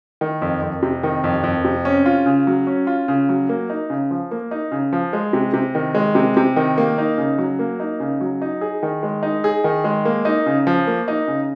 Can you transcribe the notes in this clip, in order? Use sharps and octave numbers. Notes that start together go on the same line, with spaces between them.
D#3
F2
F2
C3
D#3
F2
F2
C3
C#4
F4
C#3
F#3
C#4
F4
C#3
F#3
A#3
D#4
C#3
F3
A#3
D#4
C#3
F3
G#3
C3
C3
D#3
G#3
C3
C3
D#3
A#3
D#4
C#3
F#3
A#3
D#4
C#3
F#3
D#4
G#4
D#3
G#3
D#4
G#4
D#3
G#3
A#3
D#4
C#3
F3
A#3
D#4
C#3